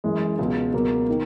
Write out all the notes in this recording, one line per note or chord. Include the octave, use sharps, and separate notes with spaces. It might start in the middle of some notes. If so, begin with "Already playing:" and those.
F#2 E3 G#3
C#2 B2 F#3
C#2 B2 F#3 A#3
D#3